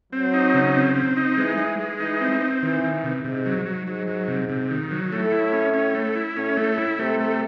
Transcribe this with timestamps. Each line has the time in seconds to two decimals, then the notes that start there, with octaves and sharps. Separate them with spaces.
0.13 F#3 C4
0.34 D#4
0.54 C#3
0.75 C4
0.95 C4
1.16 D#4
1.37 E3 G#3
1.58 G#3
1.79 G#3
2.00 E3 D#4
2.21 C4
2.41 C4
2.62 D#3 E3
2.83 D#3
3.03 C3
3.24 G#2 C3
3.46 F#3
3.66 F#3
3.87 G#2 F#3
4.07 F#3
4.28 C3
4.49 C3
4.71 D#3
4.91 F#3
5.12 A2 A3
5.32 E4
5.53 C#4
5.74 C#4
5.95 A3
6.16 E4
6.37 A2 C#4
6.57 A3
6.78 E4
6.99 C3 A3
7.20 A3